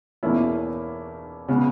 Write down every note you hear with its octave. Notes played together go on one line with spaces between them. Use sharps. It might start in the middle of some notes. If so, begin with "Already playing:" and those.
E2 B2 A#3 C#4 E4
C#3 G#3 B3